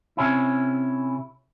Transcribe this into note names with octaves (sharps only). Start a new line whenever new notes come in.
C3 C#4 E4